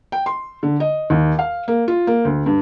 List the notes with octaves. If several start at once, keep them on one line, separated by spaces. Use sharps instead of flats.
G5
C6
D3
D#5
D#2
F5
A#3
F4
A#3
D2
G2